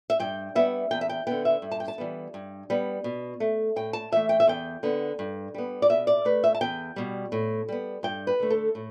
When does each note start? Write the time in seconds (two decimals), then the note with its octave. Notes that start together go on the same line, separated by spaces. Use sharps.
0.10 E5
0.19 G2 G5
0.55 G3 B3 E5
0.91 E2 G5
1.01 E5
1.09 G5
1.27 D3 B3 G5
1.45 E5
1.62 G2
1.71 A5
1.80 G5
1.88 A5
1.98 E3 G3 B3
2.34 G2
2.70 G3 B3
3.04 B2
3.40 A3
3.76 A2 G5
3.93 A5
4.12 E3 A3 E5
4.29 G5
4.40 E5
4.47 E2 G5
4.83 D3 B3
5.19 G2
5.54 G3 B3
5.82 D5
5.89 B2 E5
6.07 D5
6.25 A3 B4
6.44 E5
6.54 A5
6.61 E2 G5
6.96 B2 G3
7.32 A2
7.69 G3 B3
8.03 G2 G5
8.27 B4
8.40 D3 A3
8.50 A4
8.75 A2